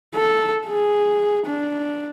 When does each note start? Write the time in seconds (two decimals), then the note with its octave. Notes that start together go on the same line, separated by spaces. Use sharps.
0.15 A4
0.68 G#4
1.46 D4